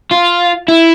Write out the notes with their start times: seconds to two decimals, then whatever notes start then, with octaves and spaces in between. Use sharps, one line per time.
0.11 F4
0.68 E4